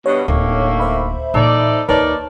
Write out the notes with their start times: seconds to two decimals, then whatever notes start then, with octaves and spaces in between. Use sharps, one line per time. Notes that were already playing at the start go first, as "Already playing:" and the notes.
0.06 G2 B2 C#5
0.28 D1 D#3 A3 A#3
0.80 C5 E5 B5
1.34 A#2 E3 D#4 A4 D5
1.89 D#2 D#4 A#4 B4 C#5 D5 A5